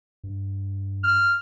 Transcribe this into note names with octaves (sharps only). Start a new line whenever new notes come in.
G2
F6